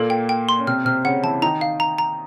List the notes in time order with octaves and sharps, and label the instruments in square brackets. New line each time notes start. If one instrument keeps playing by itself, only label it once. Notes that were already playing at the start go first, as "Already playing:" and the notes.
Already playing: [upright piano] A#2 A#3 [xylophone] A4
[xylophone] G5
G5
C6
[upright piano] C#4
[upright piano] C3 C4 [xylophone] F6
[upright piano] C3 C4 [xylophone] F6
[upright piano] C#3 C#4 [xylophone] F#5
[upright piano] E3 E4 [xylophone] A5
[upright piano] D#3 D#4 [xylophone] A#5
[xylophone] F5
A#5
A#5